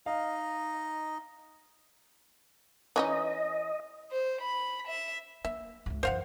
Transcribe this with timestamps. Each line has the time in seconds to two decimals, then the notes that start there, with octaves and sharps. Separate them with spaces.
0.06 D#4 D#5 F5
2.96 E3 C#4 D#4 D#5
4.12 C5
4.41 B5
4.88 E5
5.45 A#3 E5
5.86 D#1 C#2
6.03 F#2 E3 C5 F5 F#5